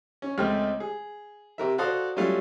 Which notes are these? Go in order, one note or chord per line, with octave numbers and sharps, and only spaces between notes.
C#4
C#2 G#3 A3 C4 G5 F6
G#4
C3 A#4 E5
F#4 A4 C5 D5 F5 D#6
F#3 G3 A3 C#4 F4